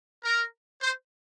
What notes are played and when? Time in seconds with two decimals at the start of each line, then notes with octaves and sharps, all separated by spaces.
0.24 A#4
0.82 C5